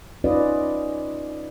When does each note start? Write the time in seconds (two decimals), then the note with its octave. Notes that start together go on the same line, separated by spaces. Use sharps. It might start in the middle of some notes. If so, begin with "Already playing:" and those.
0.24 C#4 D#4 F4 B4 D5 D#5